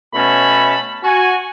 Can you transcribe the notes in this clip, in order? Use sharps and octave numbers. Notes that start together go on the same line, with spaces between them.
B2 A3 C#4 C#5 A5 B5
F#4 G#5